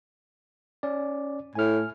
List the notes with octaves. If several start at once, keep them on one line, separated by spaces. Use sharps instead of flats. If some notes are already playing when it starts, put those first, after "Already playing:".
C#4 D5
A2 G#5 F6